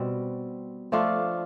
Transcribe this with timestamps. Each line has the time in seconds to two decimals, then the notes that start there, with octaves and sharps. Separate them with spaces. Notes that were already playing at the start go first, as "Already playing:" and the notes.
Already playing: B2 G3 C4
0.92 F3 A3 D4 F4